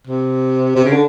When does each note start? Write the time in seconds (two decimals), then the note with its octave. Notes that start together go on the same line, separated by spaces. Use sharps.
0.07 C3
0.76 C3
0.85 C#3
0.93 D3